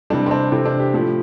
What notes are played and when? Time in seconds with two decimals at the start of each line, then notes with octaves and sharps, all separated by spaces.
0.10 C3 E3 G3 D4
0.26 C4
0.31 D4
0.52 C3 E3 A3 C4
0.65 D4
0.80 G4
0.94 A2 F3 A3